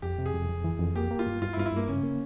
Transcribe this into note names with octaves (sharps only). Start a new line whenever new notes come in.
F2 G4
C3
G#4
F2
F2
E3
F2
A#3 G4
A#3
F4
G2
G2 F4
E4
G2 F4
E4
G2 A#3
C#3 C#4
A#3